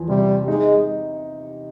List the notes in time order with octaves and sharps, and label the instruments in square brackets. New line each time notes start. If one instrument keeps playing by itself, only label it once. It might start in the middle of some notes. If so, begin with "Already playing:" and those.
Already playing: [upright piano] E2 F3
[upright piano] C3 [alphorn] G3
[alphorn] G#3 [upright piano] D#4